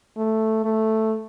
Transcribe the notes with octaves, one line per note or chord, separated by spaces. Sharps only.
A3
A3